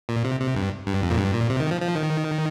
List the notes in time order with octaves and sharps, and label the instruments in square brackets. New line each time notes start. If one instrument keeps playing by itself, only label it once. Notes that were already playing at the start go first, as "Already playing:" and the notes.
[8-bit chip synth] A#2
C3
C3
G2
G2
F2
A#2
G2
A#2
C3
D#3
F3
F3
D#3